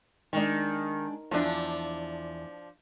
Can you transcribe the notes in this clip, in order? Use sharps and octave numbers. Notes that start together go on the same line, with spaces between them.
D#3 G#3 D4
E2 F3 D4 E5